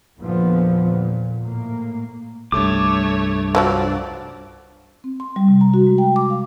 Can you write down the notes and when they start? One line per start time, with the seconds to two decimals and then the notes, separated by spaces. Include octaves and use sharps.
0.19 E2 A#2 D3 F3 B3
0.85 A#2
1.44 A2 A#3
2.52 C2 G2 A3 C#5 D6
3.55 D3 F3 F#3 D4 D5
5.04 C4
5.20 C6
5.36 G3
5.48 C3
5.61 A#5
5.74 F#4
5.87 G#3
5.98 G5
6.16 D6
6.30 F5